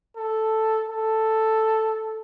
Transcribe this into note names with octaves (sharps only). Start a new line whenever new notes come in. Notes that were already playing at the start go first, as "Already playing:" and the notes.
A4
A4